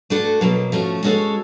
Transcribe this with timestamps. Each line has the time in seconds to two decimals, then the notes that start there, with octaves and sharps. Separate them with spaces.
0.10 A3 D4 F#4 A4
0.41 B2 F#3 A#3
0.72 F3 A3 C#4 F#4
1.03 G#3 C#4 F#4 A4 C#5